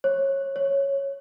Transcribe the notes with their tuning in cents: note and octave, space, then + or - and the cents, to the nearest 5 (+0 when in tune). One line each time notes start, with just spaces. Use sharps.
C#5 -25
C#5 -5